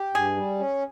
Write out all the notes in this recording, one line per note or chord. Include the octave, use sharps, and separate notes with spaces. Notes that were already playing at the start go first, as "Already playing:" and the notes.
Already playing: G4
G2 G#4
G3
C#4